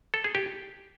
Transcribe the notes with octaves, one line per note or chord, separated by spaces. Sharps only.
A4
G#4
G4